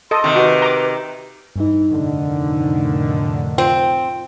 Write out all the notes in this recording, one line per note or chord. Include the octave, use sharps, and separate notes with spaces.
A4 D#5 C6
C3 D#3
F#4 B4
A#5 D6
G2 E3 D#4
F1 A2 D3 D#3
C4 F4